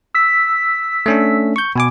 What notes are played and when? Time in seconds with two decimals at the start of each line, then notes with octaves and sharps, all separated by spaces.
0.14 E6 B6
1.06 A3 C#4 D4
1.56 C#6 G6
1.76 B2 G#5 D6